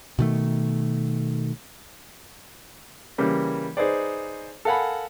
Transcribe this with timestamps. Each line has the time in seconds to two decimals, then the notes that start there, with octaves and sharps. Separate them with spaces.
0.19 B2 D#3 A3
3.18 C#3 E3 G3 A#3
3.77 D#4 G#4 B4 C5 D5
4.65 A4 A#4 F5 F#5 G#5 B5